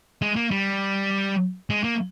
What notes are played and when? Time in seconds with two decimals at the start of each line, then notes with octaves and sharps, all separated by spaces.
0.22 G#3
0.36 A#3
0.51 G3
1.70 G#3
1.84 A#3